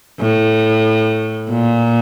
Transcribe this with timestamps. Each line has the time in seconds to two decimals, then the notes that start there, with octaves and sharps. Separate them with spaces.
0.20 A2
1.50 A#2